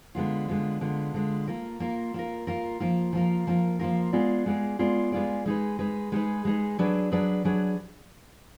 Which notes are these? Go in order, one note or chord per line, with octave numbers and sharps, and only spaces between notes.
D3 G#3 B3 F4
D3 G#3 B3 F4
D3 G#3 B3 F4
D3 G#3 B3 F4
A#3 F4 A#4
A#3 F4 A#4
A#3 F4 A#4
A#3 F4 A#4
F3 A#3 F4 A#4
F3 A#3 F4 A#4
F3 A#3 F4 A#4
F3 A#3 F4 A#4
G#3 B3 F4 G#4 D5
G#3 B3 F4 G#4 D5
G#3 B3 F4 G#4 D5
G#3 B3 F4 G#4 D5
G#3 D#4 G#4 B4
G#3 D#4 G#4 B4
G#3 D#4 G#4 B4
G#3 D#4 G#4 B4
F#3 D4 G#4 B4 D5
F#3 D4 G#4 B4 D5
F#3 D4 G#4 B4 D5